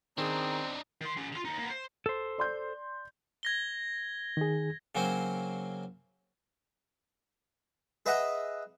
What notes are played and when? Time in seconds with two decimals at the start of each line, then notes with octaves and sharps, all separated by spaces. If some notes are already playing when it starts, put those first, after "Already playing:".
0.18 D#3 C4 D4 D#4 G#4 A#5
1.01 D#3 C6
1.17 C#4 G4
1.32 D3 F4
1.45 D#2 D#4
1.59 A#3 B3
1.70 C5
2.06 A4 C5
2.38 D5 C6 G6
3.43 G#6 A#6 G7
4.37 D#3 G#4
4.95 C#3 F#3 A#3 C4 C#4 C5
8.06 G#4 B4 D#5 E5 F#5